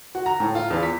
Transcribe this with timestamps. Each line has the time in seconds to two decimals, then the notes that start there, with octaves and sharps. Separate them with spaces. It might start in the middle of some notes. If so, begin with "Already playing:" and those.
0.15 F#4
0.26 A#5
0.40 A2
0.55 F4
0.70 E2
0.83 B6